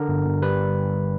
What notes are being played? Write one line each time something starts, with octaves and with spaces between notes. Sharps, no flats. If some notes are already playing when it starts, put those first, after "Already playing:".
Already playing: D3 A#4
G1
G1
G3 B4